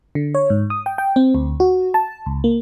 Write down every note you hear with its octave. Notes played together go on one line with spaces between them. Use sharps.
D3
C#5
G#2
D#6
G5
G5
C4
D2
F#4
A5
C#2
A#3